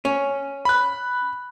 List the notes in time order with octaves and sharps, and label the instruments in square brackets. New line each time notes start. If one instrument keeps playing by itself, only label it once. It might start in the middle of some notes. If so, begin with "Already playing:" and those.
[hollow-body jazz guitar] C#4
[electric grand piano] B5 F#6